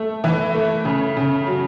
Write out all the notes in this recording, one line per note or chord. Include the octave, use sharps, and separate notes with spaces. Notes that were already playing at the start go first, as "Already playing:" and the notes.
Already playing: A3
E3
A3
C#3
C#3
F#3